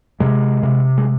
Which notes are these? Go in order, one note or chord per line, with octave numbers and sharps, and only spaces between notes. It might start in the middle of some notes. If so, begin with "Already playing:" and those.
C3 G#3
C3
G#3